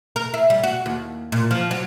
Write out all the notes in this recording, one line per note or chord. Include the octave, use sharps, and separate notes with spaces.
A#4
E4
G3
F#4
D#2
A#2
F3
F#3